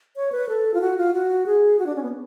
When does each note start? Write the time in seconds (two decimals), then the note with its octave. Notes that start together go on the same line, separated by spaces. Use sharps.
0.16 C#5
0.32 B4
0.49 A4
0.74 F4
0.81 F#4
0.97 F4
1.13 F#4
1.46 G#4
1.79 F#4
1.86 D4
1.96 C#4
2.03 B3